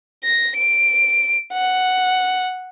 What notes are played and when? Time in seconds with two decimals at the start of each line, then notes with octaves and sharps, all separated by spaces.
0.24 A#6
0.56 D7
1.54 F#5